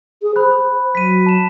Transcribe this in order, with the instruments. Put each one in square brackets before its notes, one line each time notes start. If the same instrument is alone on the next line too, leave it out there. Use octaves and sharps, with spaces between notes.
[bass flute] G#4
[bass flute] C5 [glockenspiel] B5 F#6
[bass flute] F#3 [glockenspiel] B6 D#7
[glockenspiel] A5 E7